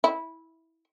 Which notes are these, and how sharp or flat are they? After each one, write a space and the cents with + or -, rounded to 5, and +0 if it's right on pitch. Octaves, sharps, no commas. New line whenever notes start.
E4 -15